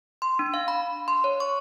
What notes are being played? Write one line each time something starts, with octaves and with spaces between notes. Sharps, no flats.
C6
D4
F5
B5
C6
C#5
C#6